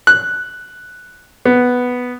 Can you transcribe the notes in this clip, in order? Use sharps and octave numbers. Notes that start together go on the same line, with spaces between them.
F#6
B3